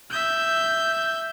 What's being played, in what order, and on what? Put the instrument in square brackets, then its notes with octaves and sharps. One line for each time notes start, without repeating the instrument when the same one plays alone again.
[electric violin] E5 G6